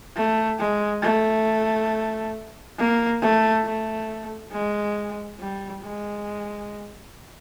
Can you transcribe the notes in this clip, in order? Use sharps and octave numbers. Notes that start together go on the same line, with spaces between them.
A3
G#3
A3
A#3
A3
A3
G#3
G3
G#3